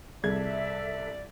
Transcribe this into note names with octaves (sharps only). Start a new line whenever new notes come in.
C2 G3 G#4 A4 D5 E5 G#6